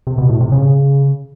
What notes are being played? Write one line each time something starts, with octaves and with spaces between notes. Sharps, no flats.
C3
B2
A2
C3
C#3